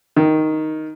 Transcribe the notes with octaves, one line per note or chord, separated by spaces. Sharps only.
D#3